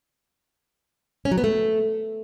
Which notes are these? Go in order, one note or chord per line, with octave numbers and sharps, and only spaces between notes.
C#4
F#3
B3
A3